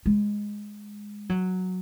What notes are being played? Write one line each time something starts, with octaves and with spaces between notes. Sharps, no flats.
G#3
F#3